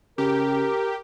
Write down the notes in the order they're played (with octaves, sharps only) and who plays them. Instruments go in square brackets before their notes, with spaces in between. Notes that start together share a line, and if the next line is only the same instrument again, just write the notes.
[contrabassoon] C#3 [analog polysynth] G4 [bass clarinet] A#4